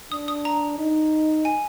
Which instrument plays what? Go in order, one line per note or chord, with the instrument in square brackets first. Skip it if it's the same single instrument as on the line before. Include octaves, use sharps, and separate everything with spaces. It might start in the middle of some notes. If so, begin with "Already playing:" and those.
[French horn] D4 [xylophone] D#6
[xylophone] D#6
A#5
[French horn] D#4
[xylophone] G#5